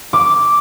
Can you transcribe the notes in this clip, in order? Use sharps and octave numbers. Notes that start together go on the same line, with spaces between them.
D6